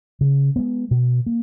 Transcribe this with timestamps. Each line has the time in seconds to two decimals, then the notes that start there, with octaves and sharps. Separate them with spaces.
0.21 C#3
0.56 G#3 B3
0.91 B2
1.26 A#3